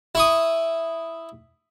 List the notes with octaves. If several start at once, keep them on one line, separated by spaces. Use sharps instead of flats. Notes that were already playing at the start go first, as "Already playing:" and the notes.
E4 C#6 D#6